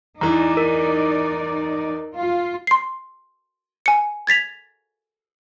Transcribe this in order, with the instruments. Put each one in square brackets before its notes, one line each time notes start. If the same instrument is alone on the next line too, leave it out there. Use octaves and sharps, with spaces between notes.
[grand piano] E2 E3 [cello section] D#4 D5 [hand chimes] A#5
[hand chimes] A#4
[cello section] F4
[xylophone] C6 C7
G#5 C#7
G#6 A6 B6 F7